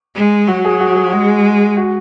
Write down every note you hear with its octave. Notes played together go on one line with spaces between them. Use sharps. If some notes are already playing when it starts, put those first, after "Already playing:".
G#3
F#3 F#4
G#4
F#4
G#4
G#3 F#4
F#4